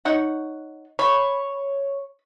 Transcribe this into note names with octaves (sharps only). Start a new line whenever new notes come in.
D#4 C#5 F#5
C#5 B5